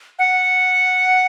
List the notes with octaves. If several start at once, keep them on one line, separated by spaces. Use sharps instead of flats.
F#5